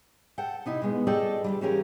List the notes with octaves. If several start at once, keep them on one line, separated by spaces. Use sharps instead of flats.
A4 F#5 G5
C3 D#4 E4
B2 G#3 B3
F4 G#4 A4 D5 D#5 G5
D2 B2 G3
E3 A#3 C#4 G4 G#4 A#4